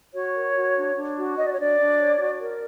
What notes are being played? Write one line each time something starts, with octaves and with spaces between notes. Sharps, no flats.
F#4 C#5
A#4
F#4
D4
D4
F#4
C#5 D#5
D5
C#5
D4 D5
D4
C#5
F#4
A#4